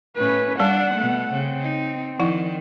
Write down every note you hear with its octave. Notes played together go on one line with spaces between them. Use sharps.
A2 C#4 B4
G3 D4 D5 F#5 A5
B2 A3
C#3 C4
D#4
D#3 F3 E4 F#5